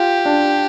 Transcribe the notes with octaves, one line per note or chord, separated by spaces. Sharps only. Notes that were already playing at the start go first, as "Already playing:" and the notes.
Already playing: F4 G4
D4